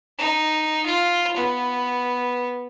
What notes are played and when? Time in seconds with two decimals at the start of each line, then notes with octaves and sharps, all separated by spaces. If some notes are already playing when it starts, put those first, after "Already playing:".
0.19 D#4
0.86 F4
1.36 B3